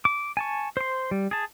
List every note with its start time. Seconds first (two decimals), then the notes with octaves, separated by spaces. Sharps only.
0.05 D6
0.37 G#5 A5 C#6
0.77 C5 C6
1.11 G3
1.31 G#4 A5